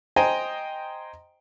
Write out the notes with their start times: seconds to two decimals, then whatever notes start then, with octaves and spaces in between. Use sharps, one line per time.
0.16 C5 D#5 G5 G#5 A#5